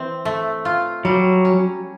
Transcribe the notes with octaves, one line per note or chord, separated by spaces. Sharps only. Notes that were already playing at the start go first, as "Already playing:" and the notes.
Already playing: E3 C4
A3
F4
F#3 G3
C#4